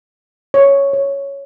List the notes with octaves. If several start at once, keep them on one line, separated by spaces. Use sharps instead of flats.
C#5
C#5